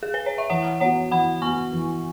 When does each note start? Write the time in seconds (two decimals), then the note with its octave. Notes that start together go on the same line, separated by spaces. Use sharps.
0.03 G#4
0.14 B4
0.26 C#5
0.38 E5
0.50 E3 C#5 F#5
0.80 B3 F#4 C#5 F#5
1.11 E3 F#5 B5
1.42 B3 F#4 G#5 C#6
1.72 E3